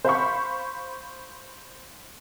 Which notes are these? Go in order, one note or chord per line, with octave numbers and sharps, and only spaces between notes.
C5 F5 B5 C#6